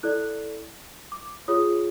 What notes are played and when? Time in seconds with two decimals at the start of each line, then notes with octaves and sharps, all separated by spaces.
0.03 E4 A4 D5 F#6
1.12 D6
1.48 F4 G#4 C#5 D#6